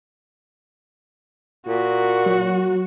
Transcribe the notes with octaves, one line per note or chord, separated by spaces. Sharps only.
A#2 F#4
F#3